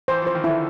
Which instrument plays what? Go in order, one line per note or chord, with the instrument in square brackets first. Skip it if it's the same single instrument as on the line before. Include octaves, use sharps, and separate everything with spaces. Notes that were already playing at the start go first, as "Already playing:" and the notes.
[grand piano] E3 [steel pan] C5
[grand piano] F3 [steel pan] C5
[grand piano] D#3
[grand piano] D3 [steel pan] E4